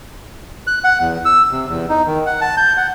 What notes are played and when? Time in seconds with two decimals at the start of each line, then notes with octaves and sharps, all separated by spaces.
0.67 F#6
0.84 F#5
1.00 E2
1.25 E6
1.51 C3
1.69 E2
1.89 D#4
2.07 D#3
2.26 F#5
2.41 A5
2.57 G6
2.77 F#5